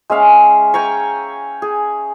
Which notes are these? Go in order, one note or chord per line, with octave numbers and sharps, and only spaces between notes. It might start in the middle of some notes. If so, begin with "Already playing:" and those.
G#3 C#4 E5 F5
G5 G#5 A#5 C#6
G#4